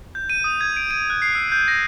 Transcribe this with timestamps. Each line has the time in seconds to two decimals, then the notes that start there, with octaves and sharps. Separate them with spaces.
0.15 G6
0.30 D#7
0.44 D#6
0.61 G#6
0.77 D7
0.91 D#7
1.10 F#6
1.22 C7
1.35 E6
1.52 G6
1.68 A#6